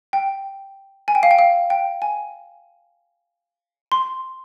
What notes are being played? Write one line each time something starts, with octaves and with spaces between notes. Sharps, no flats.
G5
G#5
G5
F5
G5
F5
G5
G#5
C6